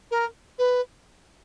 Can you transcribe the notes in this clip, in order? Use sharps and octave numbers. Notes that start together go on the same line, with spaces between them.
A#4
B4